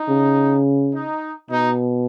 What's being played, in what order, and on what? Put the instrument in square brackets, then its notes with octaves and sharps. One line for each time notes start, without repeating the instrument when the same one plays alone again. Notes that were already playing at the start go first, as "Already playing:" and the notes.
Already playing: [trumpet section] D#4
[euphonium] C#3
[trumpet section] D#4
[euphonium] B2 [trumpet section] D#4